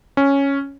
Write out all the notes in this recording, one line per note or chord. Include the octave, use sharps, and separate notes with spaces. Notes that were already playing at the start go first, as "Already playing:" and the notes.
C#4